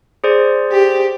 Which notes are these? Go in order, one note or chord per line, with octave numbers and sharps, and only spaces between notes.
G#4 C5 D5
G4